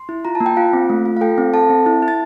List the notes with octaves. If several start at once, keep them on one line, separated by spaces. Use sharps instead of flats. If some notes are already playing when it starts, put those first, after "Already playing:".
Already playing: C6
E4
F4 A#5
A5
A#3
G5
F4 F5
C4
A3
F4
F5
A4 G5
C4
A4 A5
C4
E4
E4
A6